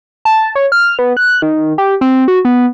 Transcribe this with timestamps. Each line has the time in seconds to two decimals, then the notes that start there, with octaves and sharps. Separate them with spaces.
0.25 A5
0.55 C#5
0.72 F6
0.99 B3
1.17 F#6
1.42 D#3
1.78 G4
2.01 C4
2.28 F#4
2.45 B3